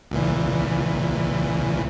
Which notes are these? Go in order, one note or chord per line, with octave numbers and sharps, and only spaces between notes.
C#2 A#2 E3